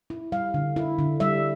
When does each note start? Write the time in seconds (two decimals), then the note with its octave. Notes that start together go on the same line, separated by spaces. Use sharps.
0.10 E4
0.32 G3 F5
0.54 D3
0.76 E4
0.99 D3
1.20 G3 E5